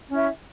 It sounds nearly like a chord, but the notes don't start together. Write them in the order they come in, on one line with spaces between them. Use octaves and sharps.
C#4 E4 E5